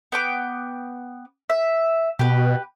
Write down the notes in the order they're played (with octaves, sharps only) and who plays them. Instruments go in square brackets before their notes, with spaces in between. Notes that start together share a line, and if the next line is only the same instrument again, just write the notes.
[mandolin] B3 G5 D6
E5
[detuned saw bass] B2 [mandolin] G4 B4